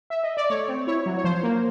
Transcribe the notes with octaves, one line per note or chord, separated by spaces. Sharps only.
E5
D#5
D5
A3 C#5
C4
E4 C#5
F#3
C#5
F3 C5
A#3